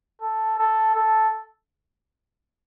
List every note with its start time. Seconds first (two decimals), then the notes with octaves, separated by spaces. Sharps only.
0.21 A4
0.58 A4
0.95 A4